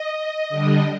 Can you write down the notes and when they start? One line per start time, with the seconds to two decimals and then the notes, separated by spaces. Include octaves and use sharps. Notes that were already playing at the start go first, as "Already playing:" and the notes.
Already playing: D#5
0.49 D3 G3 D4